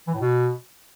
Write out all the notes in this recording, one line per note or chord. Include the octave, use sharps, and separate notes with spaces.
E3
A2
B2